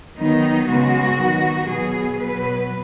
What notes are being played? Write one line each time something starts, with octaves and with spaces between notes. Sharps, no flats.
D#3 F#3 B3 D#4
C#3 G#3 B3 F#4
D#3 F#3 B3
B2 F#3 B3 G#4
B2 F#3 B3 B4